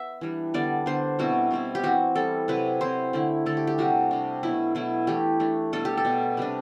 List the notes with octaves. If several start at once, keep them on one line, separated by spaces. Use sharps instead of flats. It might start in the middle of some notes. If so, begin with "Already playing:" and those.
Already playing: B3 E5
E3 G3 D4
D3 G3 B3 D4 D5
D3 G3 B3 D4 C5
B2 G3 C4 E4 F#4
B2 G3 C4 E4
G4
E3 G3 C4 F#4
E3 G3 C4 A4
C3 F#3 C4 E4 B4
C3 F#3 C4 E4 C5
D3 A3 E4
D3 A3 E4 A4
G4
G4
C3 G3 D4 F#4
C3 G3 D4
B2 F#3 A3 E4
B2 F#3 A3 E4
E3 A3 D4 G4
E3 A3 D4
B2 G3 D4 A4
G4
A4
B2 G3 D4
C3 G3 D4 B4